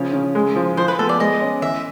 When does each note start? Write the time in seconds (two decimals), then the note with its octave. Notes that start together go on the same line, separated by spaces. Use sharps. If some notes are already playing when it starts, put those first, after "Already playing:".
Already playing: C#3 F3 C#5
0.13 C#3
0.35 G#3
0.56 F3
0.77 F3 C5
0.88 B4
0.99 B3 A4
1.09 D5
1.20 G#3 D#5
1.41 C#4
1.62 E3 E5